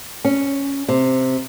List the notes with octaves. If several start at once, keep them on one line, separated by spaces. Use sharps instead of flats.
C#4
C3